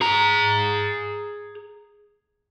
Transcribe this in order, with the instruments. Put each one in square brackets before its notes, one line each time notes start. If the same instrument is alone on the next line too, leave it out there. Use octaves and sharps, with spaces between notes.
[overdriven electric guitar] G#4 A#5